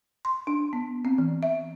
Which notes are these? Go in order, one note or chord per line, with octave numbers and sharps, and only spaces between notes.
C6
D4
B3
C4
E3
E5